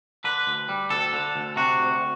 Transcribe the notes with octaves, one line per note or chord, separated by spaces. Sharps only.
D3 B4
D2
G3
D2 A4
D3
D2
C3 F#4
D2